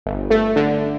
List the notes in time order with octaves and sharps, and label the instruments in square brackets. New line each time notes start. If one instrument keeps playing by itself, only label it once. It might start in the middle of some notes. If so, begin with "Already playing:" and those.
[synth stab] G1
A3
D3